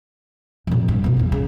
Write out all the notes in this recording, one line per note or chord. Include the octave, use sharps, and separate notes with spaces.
F2 A#2
G2
B2 B3
B1 E2
C#3